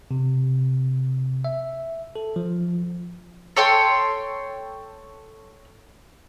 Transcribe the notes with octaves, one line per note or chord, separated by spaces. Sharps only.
C3
E5
A4
F3
A4 C#5 G5 C6